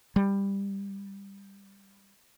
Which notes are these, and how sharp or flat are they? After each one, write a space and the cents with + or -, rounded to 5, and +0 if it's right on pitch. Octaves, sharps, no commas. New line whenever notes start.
G3 +15